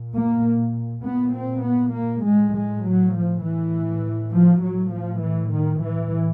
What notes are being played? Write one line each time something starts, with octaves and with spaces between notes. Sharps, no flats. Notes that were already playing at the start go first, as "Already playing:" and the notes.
Already playing: A#2
A#3
A#2 B3
C4
B3
A#3
A2 G#3
G#3
F#3
F3
A2 E3
F3
A2 F#3
F3
E3
D#3
A2 E3